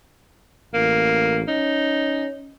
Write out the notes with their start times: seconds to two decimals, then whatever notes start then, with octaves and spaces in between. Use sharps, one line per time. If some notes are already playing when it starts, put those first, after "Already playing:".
0.74 A1 A#3
1.48 C#4 D#4